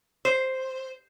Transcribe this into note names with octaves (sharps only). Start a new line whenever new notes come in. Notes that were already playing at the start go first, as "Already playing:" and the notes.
C5